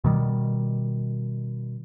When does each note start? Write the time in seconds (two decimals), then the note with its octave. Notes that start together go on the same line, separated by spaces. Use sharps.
0.04 B2 D#3 G3